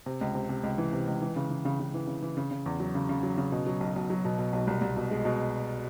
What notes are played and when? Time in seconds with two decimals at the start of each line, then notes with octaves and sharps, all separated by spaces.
0.06 C3
0.21 C#2
0.35 C3
0.49 C3
0.63 C#2
0.78 E3
0.93 C3
1.07 C#2
1.21 E3
1.36 C#3
1.50 E3
1.65 C#3
1.80 C#3
1.94 E3
2.07 C#3
2.22 E3
2.37 C#3
2.51 C#3
2.66 E2
2.80 F#3
2.95 C#3
3.09 C#3
3.23 F#3
3.38 C#3
3.52 B2
3.67 F#3
3.81 B1
3.96 B1
4.10 F#3
4.25 B2
4.39 B2
4.53 B1
4.67 C2
4.81 C2
4.97 B2
5.11 G#3
5.25 B2